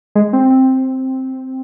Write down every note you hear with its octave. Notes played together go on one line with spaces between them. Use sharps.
G#3
C4
C4